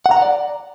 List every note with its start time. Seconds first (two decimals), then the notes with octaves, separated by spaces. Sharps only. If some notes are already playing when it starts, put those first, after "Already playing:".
0.06 F#5
0.11 A#5
0.17 F#5
0.22 D5